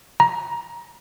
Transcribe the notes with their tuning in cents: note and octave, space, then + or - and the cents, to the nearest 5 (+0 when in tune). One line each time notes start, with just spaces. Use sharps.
A#5 +15